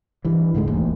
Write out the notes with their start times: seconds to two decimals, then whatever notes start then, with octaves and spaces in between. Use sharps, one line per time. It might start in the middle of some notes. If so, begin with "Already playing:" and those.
0.25 G2 E3
0.54 D2 G#2 D3 G#3
0.67 E1 A1 D#2